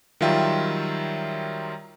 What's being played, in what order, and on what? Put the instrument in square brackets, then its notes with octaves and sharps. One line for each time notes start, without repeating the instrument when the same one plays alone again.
[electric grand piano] D#3 F#3 G3 F4 E5 G5